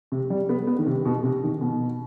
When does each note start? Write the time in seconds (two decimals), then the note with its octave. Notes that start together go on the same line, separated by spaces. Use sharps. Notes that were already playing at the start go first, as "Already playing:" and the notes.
0.12 C3
0.30 G3
0.49 B3
0.67 B3
0.79 D#3
0.86 C3
1.05 B2
1.23 C3
1.43 D#3
1.61 B2